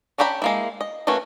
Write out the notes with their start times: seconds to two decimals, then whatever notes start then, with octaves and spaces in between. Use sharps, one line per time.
0.18 C#4 D4 G4 A#5 B5
0.42 G#3 A#3 E4
0.81 D#5
1.07 E3 A3 A#3 C#4 F#4